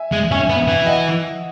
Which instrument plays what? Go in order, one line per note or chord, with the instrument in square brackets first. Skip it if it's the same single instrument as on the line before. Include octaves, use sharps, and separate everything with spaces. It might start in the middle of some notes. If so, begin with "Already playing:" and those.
Already playing: [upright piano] E5 G#5
[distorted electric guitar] G#3
[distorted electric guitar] C#4 [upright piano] E5 G#5
[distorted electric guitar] B3
E3
[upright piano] D#5 F#5